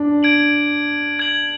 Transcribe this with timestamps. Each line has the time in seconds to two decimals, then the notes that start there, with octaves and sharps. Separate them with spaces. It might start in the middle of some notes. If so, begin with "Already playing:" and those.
Already playing: D4
0.23 G#6 D7 F#7
1.19 G#6 D7 F#7